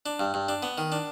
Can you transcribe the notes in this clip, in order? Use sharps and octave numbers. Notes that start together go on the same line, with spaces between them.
D4
G2
G2
D4
B3
D#3
D4